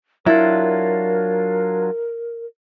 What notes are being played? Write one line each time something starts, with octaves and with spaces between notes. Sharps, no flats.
F#3 D4 E4 F4 A#4